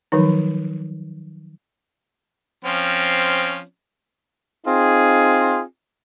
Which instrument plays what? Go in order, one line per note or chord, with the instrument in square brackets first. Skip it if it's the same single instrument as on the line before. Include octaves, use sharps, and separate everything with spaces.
[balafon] D#3 F3 F#3 D#4
[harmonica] F3 C4 C#4
[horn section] C4 D#4 F4 G#4